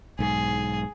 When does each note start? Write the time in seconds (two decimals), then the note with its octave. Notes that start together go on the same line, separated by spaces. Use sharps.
0.19 B1 G#2 G#4